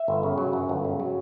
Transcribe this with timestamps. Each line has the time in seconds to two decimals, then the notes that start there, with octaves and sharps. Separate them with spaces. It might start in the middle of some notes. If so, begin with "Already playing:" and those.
Already playing: E5
0.08 G1
0.23 C#3
0.38 F#3
0.53 F#2
0.69 G1
0.85 C#3
1.00 F#3